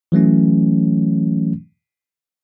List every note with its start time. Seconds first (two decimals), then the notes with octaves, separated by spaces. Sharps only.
0.12 E3 F#3 A3 C#4